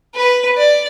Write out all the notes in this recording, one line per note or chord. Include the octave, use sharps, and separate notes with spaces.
B4
D5